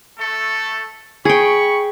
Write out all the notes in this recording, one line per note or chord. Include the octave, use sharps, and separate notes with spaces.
A3 A4
G#4 C#5 G5 B5 C#6